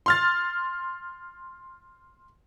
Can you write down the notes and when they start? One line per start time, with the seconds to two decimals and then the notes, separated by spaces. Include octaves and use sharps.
0.06 C6 F6 A6